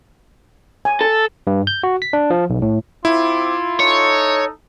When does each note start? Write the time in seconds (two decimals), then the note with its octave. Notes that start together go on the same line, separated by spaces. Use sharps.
0.85 G#5
1.01 A4
1.47 G2
1.67 G6
1.83 F#4
2.02 B6
2.13 D4
2.30 F3
2.50 B1
2.62 A2
3.05 C4 E4 F4 D6
3.80 D#4 A4 C#5